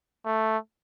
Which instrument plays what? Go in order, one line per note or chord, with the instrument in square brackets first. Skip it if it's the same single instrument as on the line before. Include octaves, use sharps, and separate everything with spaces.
[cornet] A3